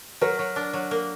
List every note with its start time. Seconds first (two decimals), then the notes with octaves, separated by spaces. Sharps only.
0.21 F#3 A#4
0.39 F#3
0.56 D4
0.74 F#3
0.91 A#3